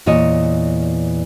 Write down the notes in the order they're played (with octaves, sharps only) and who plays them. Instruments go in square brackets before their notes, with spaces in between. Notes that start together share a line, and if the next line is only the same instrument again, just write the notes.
[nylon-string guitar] E2 A#2 E3 C#5 D#5